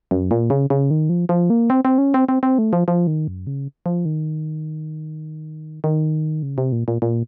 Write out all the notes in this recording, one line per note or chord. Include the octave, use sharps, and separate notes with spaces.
F#2
A#2
C#3
C#3
D#3
F3
F3
A#3
C4
C4
C#4
C4
C4
C4
A3
F3
F3
D#3
F#2
C#3
F3
D#3
D#3
C#3
C3
A#2
A#2
A#2